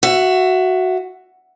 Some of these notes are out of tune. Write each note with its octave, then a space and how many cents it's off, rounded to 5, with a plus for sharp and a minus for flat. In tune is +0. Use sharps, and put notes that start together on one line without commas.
F#4 +0 E5 +20